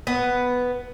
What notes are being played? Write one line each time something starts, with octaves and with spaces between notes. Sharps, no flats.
B3